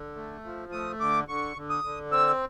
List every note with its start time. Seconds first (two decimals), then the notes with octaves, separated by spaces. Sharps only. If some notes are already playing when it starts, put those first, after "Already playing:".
Already playing: D3
0.16 A3
0.44 F3
0.72 A3 D#6
1.00 D3 D6
1.28 D3 C#6
1.57 D3
1.70 D#6
1.84 D3
2.11 C4 E6